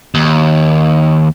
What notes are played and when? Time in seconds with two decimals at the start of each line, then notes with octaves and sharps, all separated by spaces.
0.15 D#2